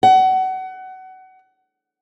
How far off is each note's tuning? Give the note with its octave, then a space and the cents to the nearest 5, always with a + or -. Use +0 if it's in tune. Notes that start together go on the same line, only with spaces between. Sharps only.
F#5 +25